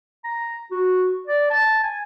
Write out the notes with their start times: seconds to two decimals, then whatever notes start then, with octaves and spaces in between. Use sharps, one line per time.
0.24 A#5
0.71 F#4
1.27 D5
1.50 A5
1.83 G#5